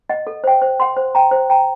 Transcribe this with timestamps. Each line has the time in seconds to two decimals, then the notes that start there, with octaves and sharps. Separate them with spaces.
0.09 D#5 F#5
0.27 A4
0.44 C5 G5
0.62 C5
0.80 F#5 C6
0.97 C5
1.15 G5 A#5
1.31 C5
1.50 G5 A#5